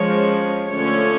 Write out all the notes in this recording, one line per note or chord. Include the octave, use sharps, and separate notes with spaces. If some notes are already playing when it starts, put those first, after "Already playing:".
Already playing: F3 G#3 C#4 C#5
D3 F3 A3 C#4 C#5